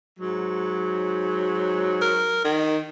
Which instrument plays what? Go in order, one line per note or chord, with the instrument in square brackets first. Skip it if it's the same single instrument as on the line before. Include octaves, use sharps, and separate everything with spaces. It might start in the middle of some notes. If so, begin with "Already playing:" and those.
[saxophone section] G#2 F#3
[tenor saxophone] A#4
D#3